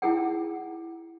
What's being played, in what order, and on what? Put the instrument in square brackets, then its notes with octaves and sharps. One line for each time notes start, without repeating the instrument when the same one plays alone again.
[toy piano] D#4 E4 G#4 F#5 G5